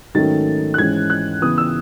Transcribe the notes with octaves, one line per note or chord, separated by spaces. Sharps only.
G#2 D#3 F#3 A3 C#4 A6
F#6
G#2 E3 G#3 C#4 G#6
F#6
C#3 E3 B3 D#6
E6